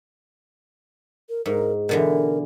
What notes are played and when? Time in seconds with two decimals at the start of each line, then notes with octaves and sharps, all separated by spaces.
1.29 A#4
1.46 G#2 A#4
1.89 B2 D3 E3 A#4